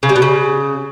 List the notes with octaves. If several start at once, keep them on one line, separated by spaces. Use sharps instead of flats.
C#3
G3
B2
C#3